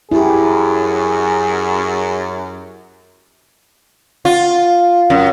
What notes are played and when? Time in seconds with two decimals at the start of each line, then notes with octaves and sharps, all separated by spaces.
0.12 F#2 E4 G4 G#4
4.25 F4
5.10 F#2